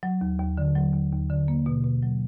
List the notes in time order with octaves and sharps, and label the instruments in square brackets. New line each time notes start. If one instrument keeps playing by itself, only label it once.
[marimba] F#3
D#2
D#2
D3
F#3
D#2
D#2
D3
A#3
B2
B2
F#3